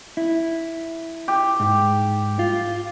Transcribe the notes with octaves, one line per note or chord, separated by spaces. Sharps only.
E4
G4
G#2
F4